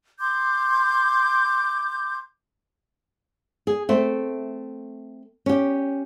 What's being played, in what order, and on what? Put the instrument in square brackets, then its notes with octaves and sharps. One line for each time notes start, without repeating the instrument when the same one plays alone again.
[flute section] C6 D6 G6
[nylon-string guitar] G#4
A3 C4
C#4 G4